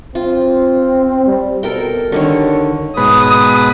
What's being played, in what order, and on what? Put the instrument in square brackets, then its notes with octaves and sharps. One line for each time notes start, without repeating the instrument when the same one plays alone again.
[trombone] C4 [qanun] F4
[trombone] G3
[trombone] B2 [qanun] A4 A#4 G5
[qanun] D3 D#3 C#5 [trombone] G3
[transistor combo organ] G#2 B2 B4 [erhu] D#6